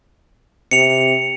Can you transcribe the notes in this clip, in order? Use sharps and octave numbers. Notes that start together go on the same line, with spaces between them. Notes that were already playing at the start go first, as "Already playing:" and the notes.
C3 C#7 F7